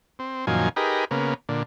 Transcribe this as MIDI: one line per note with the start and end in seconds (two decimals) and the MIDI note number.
0.19 0.45 60
0.47 0.69 42
0.47 0.69 46
0.47 0.69 51
0.47 0.69 53
0.47 0.69 80
0.76 1.05 63
0.76 1.05 67
0.76 1.05 68
0.76 1.05 70
0.76 1.05 71
1.11 1.34 49
1.11 1.34 58
1.11 1.34 59
1.49 1.63 46
1.49 1.63 50